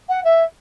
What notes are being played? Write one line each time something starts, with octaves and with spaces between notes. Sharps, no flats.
F#5
E5